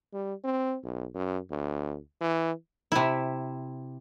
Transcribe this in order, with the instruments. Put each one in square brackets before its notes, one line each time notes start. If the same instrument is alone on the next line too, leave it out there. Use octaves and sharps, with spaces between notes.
[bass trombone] G3
C4
B1
F#2
D2
E3
[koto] C3 E4